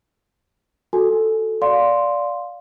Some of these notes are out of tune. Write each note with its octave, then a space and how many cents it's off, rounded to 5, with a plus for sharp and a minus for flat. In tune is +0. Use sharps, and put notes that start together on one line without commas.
F#4 +0 A4 +0 G#5 +15
D5 -15 F5 +10 C6 +0